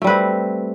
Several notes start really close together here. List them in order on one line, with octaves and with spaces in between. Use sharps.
A3 G3 B4 C4